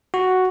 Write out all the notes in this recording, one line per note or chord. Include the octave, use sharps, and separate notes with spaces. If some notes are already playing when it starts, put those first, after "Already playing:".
F#4